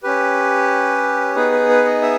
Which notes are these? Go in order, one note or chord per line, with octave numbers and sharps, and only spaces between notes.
C#4 G4 B4
B3 D#4 G#4 B4
B4
B4
D#5
E5